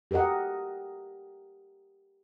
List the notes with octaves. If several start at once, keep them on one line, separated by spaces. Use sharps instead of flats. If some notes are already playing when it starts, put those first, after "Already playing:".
G4 A4 A#4 D#5 F#5